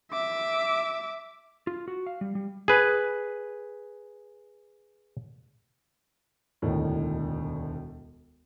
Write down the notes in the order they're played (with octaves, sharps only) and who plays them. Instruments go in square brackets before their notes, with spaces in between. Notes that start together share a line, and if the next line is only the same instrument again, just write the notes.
[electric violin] E5 D6
[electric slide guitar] F4
F#4
F5
G3
G3
[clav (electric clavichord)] G#4 B4
[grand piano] E1 D2 A2 D#3